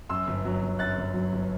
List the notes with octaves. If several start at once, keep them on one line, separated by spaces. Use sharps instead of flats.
F#2 C6 E6
G1
F#3
G1
F#2 F#6 A6
G1
F#3
G1